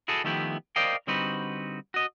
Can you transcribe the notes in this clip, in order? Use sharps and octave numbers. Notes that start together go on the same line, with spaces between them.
E4 F#4 G#4 A4
D#3 F3 A3 B3 E4 G4
A#4 C5 D5 D#5 F5 G5
D3 G3 C4 D#4 F#4 B4
F#4 D#5